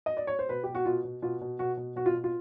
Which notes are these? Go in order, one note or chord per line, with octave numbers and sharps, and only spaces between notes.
D#5
D5
C#5
C5
B2 B4
B2 G4
F#4
B2 F4
B2
B2 F4
B2
B2 F#4
B2
B2 F#4
F4
B2
F4